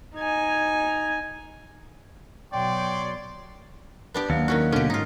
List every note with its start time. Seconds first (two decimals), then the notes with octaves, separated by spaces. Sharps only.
0.15 D#4 G#5
2.53 B2 F#3 C#5 D5 G5 C6
4.14 B3 D4 G4
4.30 D#2 F#3 A#3 F5
4.48 D#3 C#4 F#4
4.72 B2 D3 C#4 G4
4.90 G#2 D#4 F4